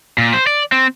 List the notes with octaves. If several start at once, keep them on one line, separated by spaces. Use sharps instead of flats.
A#2
C5
D5
C4